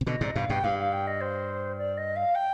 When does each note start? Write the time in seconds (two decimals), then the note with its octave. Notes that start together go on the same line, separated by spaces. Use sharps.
0.01 C3
0.07 B2 D3 D#5
0.21 G#2 C3 D5
0.29 D#5
0.35 G2 B2 F5
0.49 G2 B2 G5
0.63 G2 F5
0.78 F5
0.92 G5
1.07 D#5
1.20 C5
1.78 D5
1.97 D#5
2.16 F5
2.35 G5